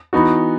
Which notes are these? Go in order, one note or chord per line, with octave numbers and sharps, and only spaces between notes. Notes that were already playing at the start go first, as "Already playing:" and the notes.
E3 B3 D#4 F#4